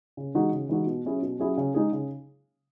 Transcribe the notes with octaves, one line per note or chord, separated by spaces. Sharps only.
C#3
E3 G#3 D#4 F#4
C#3
E3 G#3 D#4 F#4
B2
F#3 C#4 E4 G#4
B2
F#3 C#4 E4 G#4
C#3
G#3 D#4 G#4
C#3